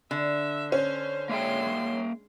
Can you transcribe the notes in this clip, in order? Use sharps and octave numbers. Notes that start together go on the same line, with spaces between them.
D3 E5
C#4 C5
G#3 A#3 E5 G5 C6